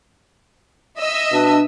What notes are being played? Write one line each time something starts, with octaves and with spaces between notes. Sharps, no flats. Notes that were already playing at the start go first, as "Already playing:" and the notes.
D#5 E5 E6
B2 D4